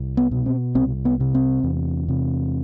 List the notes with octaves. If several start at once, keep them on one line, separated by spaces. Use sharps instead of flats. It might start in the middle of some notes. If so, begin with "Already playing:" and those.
Already playing: C2
B3
B2
C4
C2 C4
B3
C3
C4
E2
C3